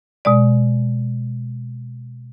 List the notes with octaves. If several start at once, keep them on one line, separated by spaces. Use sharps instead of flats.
B2 G#3 D5